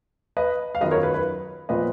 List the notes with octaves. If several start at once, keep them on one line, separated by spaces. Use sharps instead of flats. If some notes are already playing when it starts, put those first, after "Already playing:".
B4 D#5
F5
F#2 D#3 F#3 B3 F4 B4 D#5
A#4 C#5
B4
B4
A#2 F3 B3 F4 B4 D#5